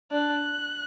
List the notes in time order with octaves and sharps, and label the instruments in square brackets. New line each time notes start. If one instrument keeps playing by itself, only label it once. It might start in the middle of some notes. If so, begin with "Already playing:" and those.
[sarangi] D4 [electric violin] F#6